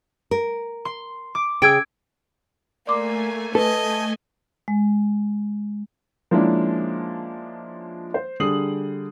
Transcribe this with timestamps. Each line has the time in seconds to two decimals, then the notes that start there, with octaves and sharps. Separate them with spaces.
0.31 A#4
0.85 C6
1.35 D6
1.62 C#3 G#4 G5 E6 G#6 D7
2.87 A3 A#3 D5 G#5 C6 D6
3.55 A4 B4 D#5
4.68 G#3
6.31 F3 G#3 A#3 C#4 D4 E4
8.14 C5
8.40 D3 G3 G#4 D#6 C7 F#7